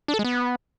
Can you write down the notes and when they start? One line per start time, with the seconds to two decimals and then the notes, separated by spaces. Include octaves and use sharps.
0.08 D4
0.14 A4
0.19 G#3
0.25 B3